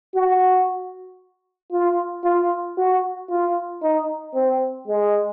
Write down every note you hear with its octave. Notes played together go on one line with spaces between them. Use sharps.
F#4
F4
F4
F#4
F4
D#4
C4
G#3